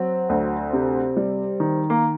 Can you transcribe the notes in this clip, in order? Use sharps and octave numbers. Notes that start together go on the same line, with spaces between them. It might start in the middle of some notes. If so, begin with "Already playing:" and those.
Already playing: F#3 C4
D2
C3
G3
D#3
A#3